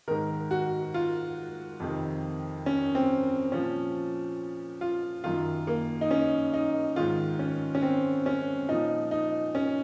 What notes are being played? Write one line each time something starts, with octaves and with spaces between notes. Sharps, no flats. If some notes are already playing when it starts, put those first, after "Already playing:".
G#2 D#3 A#4
F#4
F4
F2 C3 D#3
C#4
C4
A#2 F3 C#4
F4
F#2 D#3 F4
A#3
D#4
C#4
D#4
G#2 D#3 F4
C#4
C#4
C4
C#4
A#2 F3 D#4
D#4
C#4